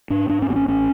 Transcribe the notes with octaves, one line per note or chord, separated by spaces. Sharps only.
G#2 D4
G#2 D4
C#4
A1 B3
C#4
A1 C#4